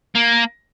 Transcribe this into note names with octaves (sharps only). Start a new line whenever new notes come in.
A#3